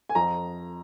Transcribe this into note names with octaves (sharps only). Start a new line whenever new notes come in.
G#5
F2 A#5